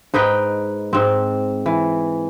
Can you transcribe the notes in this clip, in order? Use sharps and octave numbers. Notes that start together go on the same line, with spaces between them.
G#2 D#4 B4 G5
G#2 C4
E3